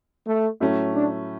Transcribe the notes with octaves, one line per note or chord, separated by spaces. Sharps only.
A3
A2 F#3 A3 C#4
D4